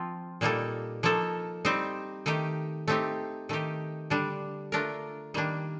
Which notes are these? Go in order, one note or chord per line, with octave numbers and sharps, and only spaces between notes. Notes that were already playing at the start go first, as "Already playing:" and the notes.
Already playing: F3 C4 F4
A#2 G3 A#3 D#4 A4
F3 A#3 D#4 A4
G3 C4 D#4
D#3 A3 D#4 G4
A3 C4 D#4 G4
D#3 A3 D#4 G4
D3 G3 D4
A3 D4 F4 A#4
D#3 G3 A#3 D4